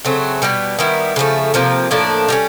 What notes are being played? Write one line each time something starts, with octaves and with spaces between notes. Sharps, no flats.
C#3 F#3 A3 C4
B2 G3 B3
D#3 G3 B3 E4
C#3 F3 A3
C3 F3 A#3
A2 F3 A#3 D4
G3 A#3 C#4